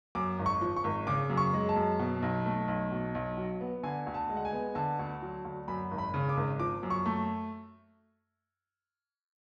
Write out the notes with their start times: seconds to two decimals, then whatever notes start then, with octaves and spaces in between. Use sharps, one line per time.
0.15 F#2 D6
0.39 G#1
0.46 C#6
0.61 F3
0.77 C#6
0.84 G#1
1.07 C#3 D6
1.30 F#2
1.37 C#6
1.53 G#3
1.69 A5
1.76 F#2
1.99 B2
2.22 B1
2.46 A3
2.68 B1
2.92 B2
3.15 B1
3.37 F#3
3.61 B3
3.83 D3 G#5
4.07 D2
4.14 A5
4.29 G#3
4.37 F#5
4.45 G#5
4.53 B3
4.75 D3 A5
4.99 D2
5.22 F#3
5.45 D2
5.68 F#2 B5
5.91 G#1
5.98 B5
6.14 C#3
6.29 D6
6.37 G#1
6.59 F3 D6
6.83 F#2
6.90 C#6
7.06 A3